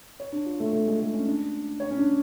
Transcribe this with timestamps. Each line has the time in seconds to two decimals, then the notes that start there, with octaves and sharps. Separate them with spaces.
0.20 C#5
0.32 D4
0.46 F4
0.60 A3
0.73 A3
0.87 G#3
1.00 A3
1.14 C#4
1.27 D4
1.80 C#5
1.91 C#4
1.98 D4